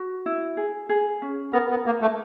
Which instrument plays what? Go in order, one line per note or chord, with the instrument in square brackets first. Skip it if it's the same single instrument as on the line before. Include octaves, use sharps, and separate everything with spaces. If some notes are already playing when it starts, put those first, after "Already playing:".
Already playing: [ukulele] F#4
E4
G#4
G#4
C#4
[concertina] B3 [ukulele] A#4
[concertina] B3
[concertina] A#3 [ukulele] A#4
[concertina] A3